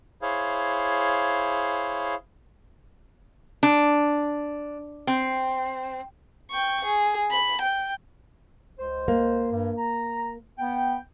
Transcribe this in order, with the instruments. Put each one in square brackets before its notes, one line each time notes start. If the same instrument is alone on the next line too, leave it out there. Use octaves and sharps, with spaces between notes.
[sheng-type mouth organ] E4 G#4 C5 C#5 F5
[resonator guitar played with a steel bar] D4
C4
[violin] G5 C#6
G#4
B5
G5
[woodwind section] C#2 C5
[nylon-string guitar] A#3
[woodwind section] G2
A#5
B3 G5